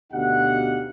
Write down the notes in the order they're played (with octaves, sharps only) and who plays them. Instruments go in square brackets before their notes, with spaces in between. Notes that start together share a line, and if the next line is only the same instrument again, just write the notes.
[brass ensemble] D2 B2 D#4 G4 F5 F#5